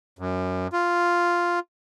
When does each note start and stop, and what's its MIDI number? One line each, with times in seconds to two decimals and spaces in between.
0.19 0.67 42
0.73 1.59 65